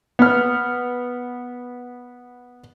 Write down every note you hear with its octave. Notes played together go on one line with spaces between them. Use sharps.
B3 F6